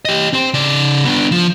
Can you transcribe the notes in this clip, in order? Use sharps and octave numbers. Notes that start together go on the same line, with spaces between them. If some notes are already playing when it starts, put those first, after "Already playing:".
G4 D#5
C4 C5
C#3 D5
B3 D4
F3